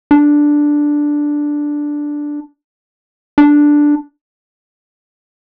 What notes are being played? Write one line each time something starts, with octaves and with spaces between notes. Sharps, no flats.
D4
D4